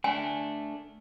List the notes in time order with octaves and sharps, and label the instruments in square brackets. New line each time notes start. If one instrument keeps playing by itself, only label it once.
[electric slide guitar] A3 D4 [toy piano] G#5